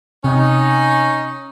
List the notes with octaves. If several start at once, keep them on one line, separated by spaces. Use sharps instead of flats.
C3 C#4 D#4